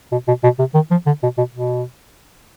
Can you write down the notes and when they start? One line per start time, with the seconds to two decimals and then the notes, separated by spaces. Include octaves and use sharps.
0.12 B2
0.27 B2
0.44 B2
0.59 C3
0.74 D#3
0.91 F3
1.06 D3
1.23 B2
1.38 B2
1.54 B2